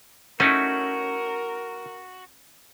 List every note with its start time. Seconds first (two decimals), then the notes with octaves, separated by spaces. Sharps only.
0.40 A3 C#4 D#4 E4 F#4 A#4